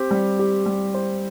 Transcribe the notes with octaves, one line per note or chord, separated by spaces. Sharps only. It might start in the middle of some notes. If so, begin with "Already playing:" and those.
Already playing: C4 G4
G3
G4
G3
C5